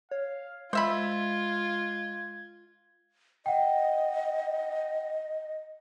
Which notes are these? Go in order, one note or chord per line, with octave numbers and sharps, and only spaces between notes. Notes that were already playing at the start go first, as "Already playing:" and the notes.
C#5 F5
G#3 F4 C5 E5 B5 G#6
D#5 F#5 G5